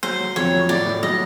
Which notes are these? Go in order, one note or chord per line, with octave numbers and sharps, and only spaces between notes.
F#3 C5
F#3
F2 C#5
F#3
A2 D5
A2
F#3 D#5